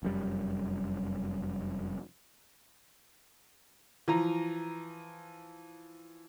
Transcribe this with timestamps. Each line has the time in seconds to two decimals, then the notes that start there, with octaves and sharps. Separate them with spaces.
0.03 F1 F#2 G3
4.08 E3 F3 A#5